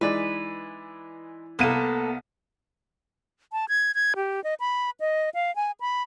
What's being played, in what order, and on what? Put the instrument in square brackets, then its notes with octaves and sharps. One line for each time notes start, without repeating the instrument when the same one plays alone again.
[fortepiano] E3 D5 [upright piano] G#3 D#4 [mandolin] B4
[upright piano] C2 F5 D#7 [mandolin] A#3 A4 [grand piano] B3
[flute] A5
G#6
G#6
G4
D#5
B5
D#5
F5
G#5
B5